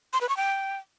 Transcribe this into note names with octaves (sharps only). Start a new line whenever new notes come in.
C6
B4
C#6
G5